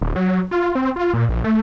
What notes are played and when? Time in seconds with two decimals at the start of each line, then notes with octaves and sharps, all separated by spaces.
0.01 D#1
0.16 F#3
0.51 F4
0.75 C4
0.96 F4
1.14 A#2
1.29 A#1
1.44 A3